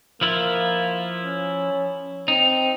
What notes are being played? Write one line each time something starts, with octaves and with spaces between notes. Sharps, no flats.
F3 A#3 E4 F4
C#4
C4 D#4